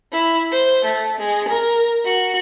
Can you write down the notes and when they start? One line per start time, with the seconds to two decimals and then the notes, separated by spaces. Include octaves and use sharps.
0.12 E4
0.50 C5
0.85 A3
1.18 G#3
1.48 A#4
2.03 F#4